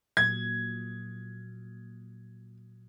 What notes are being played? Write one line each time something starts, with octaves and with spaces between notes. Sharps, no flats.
A#2 F#3 G#6